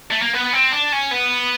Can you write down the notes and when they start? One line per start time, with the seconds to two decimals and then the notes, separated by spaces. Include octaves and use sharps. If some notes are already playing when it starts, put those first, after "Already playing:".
0.11 A3
0.22 A#3
0.33 B3
0.53 C4
0.72 D4
0.92 C#4
1.11 B3